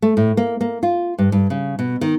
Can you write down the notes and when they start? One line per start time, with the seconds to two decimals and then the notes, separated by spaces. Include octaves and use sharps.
0.02 A3
0.17 A2
0.37 A#3
0.61 A#3
0.83 F4
1.18 G2
1.32 G2
1.50 C#3
1.79 B2
2.01 D#3